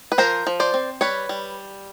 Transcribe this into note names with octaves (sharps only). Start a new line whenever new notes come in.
B4
F3 A#4 C5
F3
C5 D5
C4
G3 B4 C#5
G3